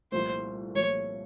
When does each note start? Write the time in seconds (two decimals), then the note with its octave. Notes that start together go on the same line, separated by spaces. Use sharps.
0.12 C2 A#2 F3 A3 C5
0.75 C2 A#2 F3 A3 C#5